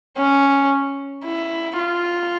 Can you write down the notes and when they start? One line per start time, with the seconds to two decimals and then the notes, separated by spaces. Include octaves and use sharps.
0.18 C#4
1.25 E4
1.79 F4